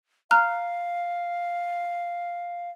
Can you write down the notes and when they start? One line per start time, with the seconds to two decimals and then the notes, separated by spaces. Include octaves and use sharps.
0.31 F5 A#5 F6 F#6